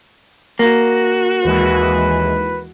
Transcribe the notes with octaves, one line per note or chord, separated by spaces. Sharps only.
A#3 F#4
D#2 E3 G#3 B4